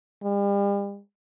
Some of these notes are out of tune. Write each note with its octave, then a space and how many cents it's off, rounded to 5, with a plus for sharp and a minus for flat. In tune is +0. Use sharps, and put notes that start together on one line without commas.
G3 +40